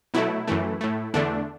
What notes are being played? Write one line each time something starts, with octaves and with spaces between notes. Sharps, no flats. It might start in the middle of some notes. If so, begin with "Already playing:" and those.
B2 F#3 A3 E4
F#2 E3 A3
A2 A3
E2 D3 A3 D4